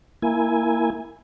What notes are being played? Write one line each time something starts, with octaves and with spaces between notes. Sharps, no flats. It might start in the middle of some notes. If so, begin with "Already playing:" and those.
A#3 E4 G#5